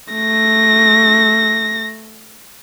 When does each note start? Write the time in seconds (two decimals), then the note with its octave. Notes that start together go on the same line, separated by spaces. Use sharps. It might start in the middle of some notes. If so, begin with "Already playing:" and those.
0.13 A3 A#6